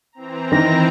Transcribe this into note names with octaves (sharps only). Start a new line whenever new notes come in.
E3 C4 A#5
D#3 A#6